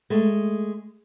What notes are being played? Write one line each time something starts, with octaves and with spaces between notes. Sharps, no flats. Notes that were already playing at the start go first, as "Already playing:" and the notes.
G#3 A3